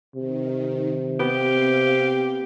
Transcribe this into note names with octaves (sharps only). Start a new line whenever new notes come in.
C3 D#3
B3 C4 G4 F5